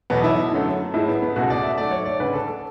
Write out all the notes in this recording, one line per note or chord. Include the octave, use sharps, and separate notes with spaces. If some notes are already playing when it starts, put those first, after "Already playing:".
E2 B2 F#3 A3 B3
E4
F#2 D3 F#3 A3
A2 G#3 E4
B3
B3
C#2 B2 A3 F#4
D5
E5
G#2 F#3 A3 D5
C#5
D5
D2 C#3 G#3 B4
A4
A4